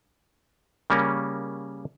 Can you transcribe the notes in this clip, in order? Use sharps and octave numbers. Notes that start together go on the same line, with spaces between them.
C#3 G3 A#3 C#4 A#4